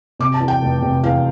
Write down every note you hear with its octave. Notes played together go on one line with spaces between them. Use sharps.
C3 D6
A5
E2
G5
F1
C3
E2 F5